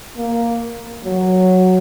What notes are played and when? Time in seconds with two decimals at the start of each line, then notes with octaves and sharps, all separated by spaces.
0.17 A#3
1.04 F#3